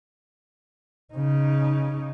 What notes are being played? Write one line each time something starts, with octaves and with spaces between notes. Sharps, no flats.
C#3 D#4